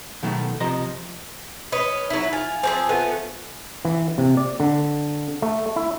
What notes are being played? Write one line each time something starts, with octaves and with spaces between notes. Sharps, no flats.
B2 D#3 F#3 A3
C3 F3 D#5 A#5
C#4 B4 D#5
F#3 D#4 E4
F4 G#5
F3 A#3 C4 G#5
F3 A3 B3
E3
C3
D5
D3
A3
E4